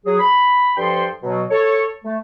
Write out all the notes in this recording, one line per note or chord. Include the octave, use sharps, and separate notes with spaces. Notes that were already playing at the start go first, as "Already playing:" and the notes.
F#3 G#4
B5
G2 F3 A4 G5 C6
B2 F#3
A4 C#5
A3